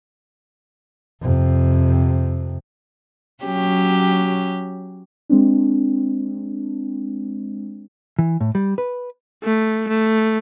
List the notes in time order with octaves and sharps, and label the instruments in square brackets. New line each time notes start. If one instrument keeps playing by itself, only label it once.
[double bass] F2 C3
[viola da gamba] F#3 C#4 G4
[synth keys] G#3 C4 D4
[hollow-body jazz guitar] E3
A2
G3
B4
[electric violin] A3
A3